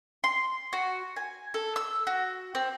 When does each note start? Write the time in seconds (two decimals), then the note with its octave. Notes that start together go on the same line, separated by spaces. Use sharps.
0.24 C6
0.73 F#4
1.17 G#5
1.54 A4
1.76 E6
2.07 F#4
2.55 C4